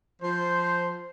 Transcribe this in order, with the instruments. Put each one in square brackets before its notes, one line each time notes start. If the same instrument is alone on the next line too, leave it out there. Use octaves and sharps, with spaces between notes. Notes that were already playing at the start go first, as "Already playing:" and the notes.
[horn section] F3 C5